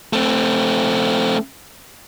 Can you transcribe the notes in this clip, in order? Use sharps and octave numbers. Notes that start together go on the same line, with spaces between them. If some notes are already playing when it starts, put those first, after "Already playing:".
A3 C4